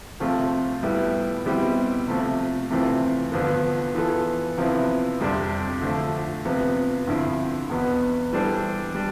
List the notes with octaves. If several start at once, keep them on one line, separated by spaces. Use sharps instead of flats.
C3 F3 A3 C4 F4
A2 G3 B3 E4
B2 G3 C4 E4 G4
C3 F3 A3
C3 E3 A3 C4 F4
G2 D3 F3 B3
E3 B3 F4 A4
C3 F3 B3 E4
F2 C3 G3 D4
D3 F3 A3
C3 F3 B3
G2 D3 F3 C4 E4
E2 B2 B3
E3 G3 D4 A4 C5
G3 D4